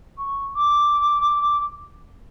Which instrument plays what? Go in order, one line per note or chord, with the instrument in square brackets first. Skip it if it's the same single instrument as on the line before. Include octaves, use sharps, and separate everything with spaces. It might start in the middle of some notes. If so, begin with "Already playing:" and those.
[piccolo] C#6
D6